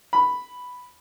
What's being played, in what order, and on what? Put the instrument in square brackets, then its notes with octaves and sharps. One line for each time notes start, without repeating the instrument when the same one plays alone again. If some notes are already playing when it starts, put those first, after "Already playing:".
[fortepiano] B5